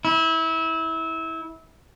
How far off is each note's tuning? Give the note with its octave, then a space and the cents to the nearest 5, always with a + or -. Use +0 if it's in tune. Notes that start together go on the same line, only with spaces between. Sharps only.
E4 -25